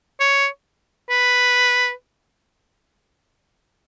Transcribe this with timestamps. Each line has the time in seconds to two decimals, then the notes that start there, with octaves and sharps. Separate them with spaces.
0.20 C#5
1.10 B4